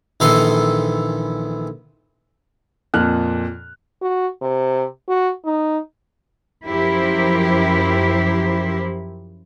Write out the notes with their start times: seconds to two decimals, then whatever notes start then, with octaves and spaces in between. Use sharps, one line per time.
0.20 A#1 D#3 E3 A4 C6
2.94 F2 A#2 F6 F#6
4.02 F#4
4.42 C3
5.08 F#4
5.45 D#4
6.66 F#2 F3 E4 G4 A#4 C5